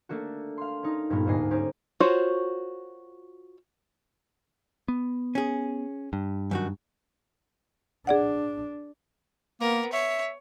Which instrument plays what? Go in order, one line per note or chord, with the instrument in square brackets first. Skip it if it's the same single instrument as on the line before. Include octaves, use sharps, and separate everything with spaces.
[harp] A3 A#3 D4 F#4
F5 C6
C#4 D#4
G2 A#2 G3 B3 A#4
D2 G#2 A#3 D#5 G#5 C7
C#4 D#4 G4 C5
[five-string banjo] F4 F#4 A#4 C5 C#5
[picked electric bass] B3
[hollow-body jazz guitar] C#4 G#4
[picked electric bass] G2
[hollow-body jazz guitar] F#2 D#3 F#4
[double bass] D4 [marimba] G#4 D5 F#5
[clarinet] A#3 [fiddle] B3 A#4
[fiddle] C#5 [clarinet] E5